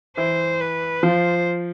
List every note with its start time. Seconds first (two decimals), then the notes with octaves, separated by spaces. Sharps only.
0.17 E3 E4 C5
0.60 B4
1.03 F3 F4 C5